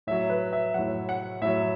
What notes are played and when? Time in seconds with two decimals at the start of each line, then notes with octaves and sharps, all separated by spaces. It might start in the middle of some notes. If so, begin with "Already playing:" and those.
0.07 A2 F#3 E5
0.30 B4
0.53 E5
0.74 A2 F#3 F#5
1.09 F#5
1.42 A2 F#3 E5